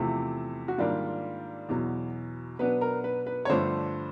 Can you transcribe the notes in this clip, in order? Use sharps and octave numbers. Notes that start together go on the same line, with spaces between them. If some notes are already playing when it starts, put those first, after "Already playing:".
Already playing: E2 C3 F3 A3
F#4
G#2 D#3 G3 A#3 D4 F4
E2 B2 F#3
B2 F#3 B3 D4 B4
A#4
B4
B4
C#5
G2 D3 F3 A3 D4 C5